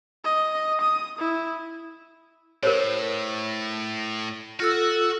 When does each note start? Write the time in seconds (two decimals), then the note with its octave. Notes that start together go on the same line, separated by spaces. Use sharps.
0.24 D#5
0.81 D#6
1.18 E4
2.63 A2 A#4 C5 C#5
4.60 F4 F#4 A4 E6